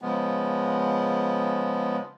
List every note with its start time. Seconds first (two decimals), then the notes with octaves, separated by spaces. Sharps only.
0.02 C#3 F3 G#3 B3